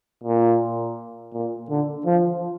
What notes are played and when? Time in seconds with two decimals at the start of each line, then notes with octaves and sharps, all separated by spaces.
0.23 A#2
1.33 A#2
1.69 D3
2.06 F3